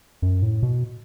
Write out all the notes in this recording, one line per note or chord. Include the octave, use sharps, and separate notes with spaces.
F#2
A2
B2